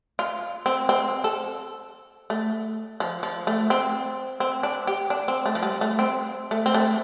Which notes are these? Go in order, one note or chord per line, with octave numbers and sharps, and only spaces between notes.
F4
C4
C4
A4
A3
F3
F3
A3
C4
C4
D4
G4
D4
C4
A3
F3
G3
A3
C4
A3
C4
A3